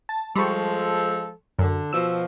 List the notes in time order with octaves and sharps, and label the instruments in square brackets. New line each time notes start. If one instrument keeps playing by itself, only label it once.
[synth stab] A5
[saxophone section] F3 G#3 A4 [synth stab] G3 C6 C#6
[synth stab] F#2 [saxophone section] D3
[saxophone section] B2 F3 [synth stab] E6